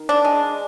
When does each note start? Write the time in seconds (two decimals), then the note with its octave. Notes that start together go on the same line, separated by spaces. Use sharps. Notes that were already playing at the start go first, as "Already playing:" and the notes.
Already playing: D#3
0.09 D4
0.25 G#3